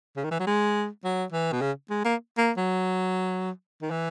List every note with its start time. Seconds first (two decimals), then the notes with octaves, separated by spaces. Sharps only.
0.16 C#3
0.24 D#3
0.31 E3
0.39 F#3
0.47 G#3
1.04 F#3
1.32 E3
1.52 B2
1.61 C#3
1.90 G#3
2.05 A#3
2.38 A#3
2.57 F#3
3.82 D#3
3.90 E3